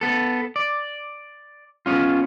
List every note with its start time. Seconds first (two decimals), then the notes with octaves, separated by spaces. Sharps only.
0.01 B3 A4
0.56 D5
1.86 B3 C#4 F4